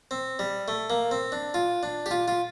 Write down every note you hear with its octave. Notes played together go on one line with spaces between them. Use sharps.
C4
G3
A3
A#3
C4
D4
F4
D4
G4
F4
F4